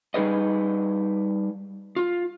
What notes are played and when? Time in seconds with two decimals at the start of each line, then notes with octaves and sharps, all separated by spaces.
0.14 G3 D#4 G#4 B4 D#5
1.96 F4